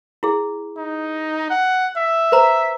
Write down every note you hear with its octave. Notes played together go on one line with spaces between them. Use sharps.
E4 G#4
D#4
F#5
E5
B4 C5 A#5